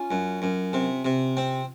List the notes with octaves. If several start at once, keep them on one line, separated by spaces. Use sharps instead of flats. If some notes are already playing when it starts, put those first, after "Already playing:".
Already playing: C#4 F4
F#2
F#2
C3
C3
C4